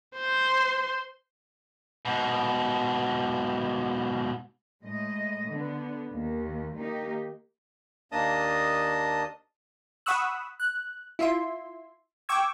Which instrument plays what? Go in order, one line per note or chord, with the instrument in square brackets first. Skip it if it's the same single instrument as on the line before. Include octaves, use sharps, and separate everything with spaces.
[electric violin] C5 C6
[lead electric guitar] G#2 B2
[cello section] A2 G#3 D#5
D3 B3
D#2
D#3 A#3 D#4 G4
[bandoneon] D#2 A#3 D4 D#5 A5 D#6
[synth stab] F#5 B5 C#6 D#6 E6 F#6
F#6
E4 F4 E5 C6
G5 C#6 D6 E6 G#6